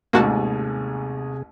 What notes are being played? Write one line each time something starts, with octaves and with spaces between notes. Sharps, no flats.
A1 D#2 G#2 C3 A#3 F#4 G#4 A5